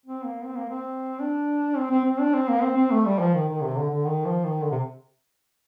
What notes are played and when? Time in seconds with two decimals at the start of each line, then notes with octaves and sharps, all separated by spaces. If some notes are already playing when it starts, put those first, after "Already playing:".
0.06 C4
0.25 A#3
0.44 C4
0.57 A#3
0.69 C4
1.20 D4
1.77 C4
1.91 C4
2.05 C4
2.20 D4
2.34 C4
2.49 A#3
2.63 C4
2.77 C4
2.91 A3
3.05 G3
3.19 F3
3.34 D#3
3.48 D#3
3.63 C3
3.77 D3
3.90 D3
4.06 D#3
4.25 F3
4.44 D#3
4.62 D3
4.71 C3